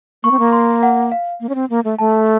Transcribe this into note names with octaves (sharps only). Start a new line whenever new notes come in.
A#3 C#6
C4
A#3
C6
F#5
F5
A#3
C#4
C4
A#3
A3
A3 A5